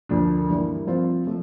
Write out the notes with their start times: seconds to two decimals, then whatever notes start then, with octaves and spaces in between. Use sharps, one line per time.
0.09 D2 D3 F3 A#3 D4
0.49 G2 E3 G3 A#3
0.87 F3 C4 F4 C5
1.27 F3 A3